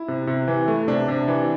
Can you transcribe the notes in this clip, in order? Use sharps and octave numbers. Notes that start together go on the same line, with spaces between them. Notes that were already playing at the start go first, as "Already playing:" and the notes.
Already playing: E4
C3
C3
E3
A3
C3 D4
C3
E3